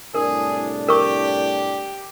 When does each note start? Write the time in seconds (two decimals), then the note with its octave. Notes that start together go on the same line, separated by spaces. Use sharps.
0.15 C2 A2 D4 G#4 A#4
0.89 G4 A#4 C#6